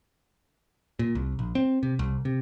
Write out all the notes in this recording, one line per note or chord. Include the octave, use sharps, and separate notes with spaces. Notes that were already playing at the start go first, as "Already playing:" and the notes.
A#2
C2
A#1
C4
C3
C2
C3